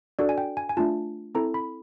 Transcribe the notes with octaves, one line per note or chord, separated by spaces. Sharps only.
D4 F#4 A4 D5
G#5
G5
G#5
G#5
A3 D4 F4 A5
C4 E4 A4 A#5
B5